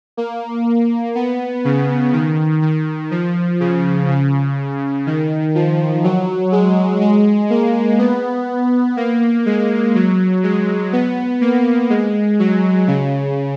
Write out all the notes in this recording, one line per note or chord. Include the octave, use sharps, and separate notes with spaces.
A#3
B3
C#3
D#3
D#3
F3
C#3
C#3
D#3
F3
F#3
G#3
G#3
A#3
B3
A#3
G#3
F#3
G#3
B3
A#3
G#3
F#3
C#3